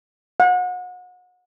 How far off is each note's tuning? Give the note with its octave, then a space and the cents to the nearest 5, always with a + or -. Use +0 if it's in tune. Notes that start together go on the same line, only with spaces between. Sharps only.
F#5 -35